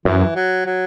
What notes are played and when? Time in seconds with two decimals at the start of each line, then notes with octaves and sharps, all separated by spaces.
0.05 F#2 E3
0.36 F#3
0.66 F#3